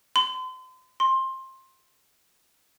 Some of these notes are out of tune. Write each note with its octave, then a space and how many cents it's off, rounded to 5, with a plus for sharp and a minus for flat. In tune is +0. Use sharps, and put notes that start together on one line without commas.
C6 -35
C6 +15